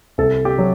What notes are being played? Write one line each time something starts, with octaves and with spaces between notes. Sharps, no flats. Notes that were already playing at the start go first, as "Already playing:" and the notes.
C2 A4
G4
F#3